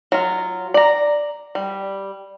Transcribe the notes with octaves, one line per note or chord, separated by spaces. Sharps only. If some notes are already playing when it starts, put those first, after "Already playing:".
F#3 F4
D5 A#5
G3